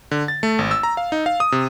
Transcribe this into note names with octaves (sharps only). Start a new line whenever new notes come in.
D3
A6
A3
G#1
E6
A#5
F5
D#4
F5
D#6
C3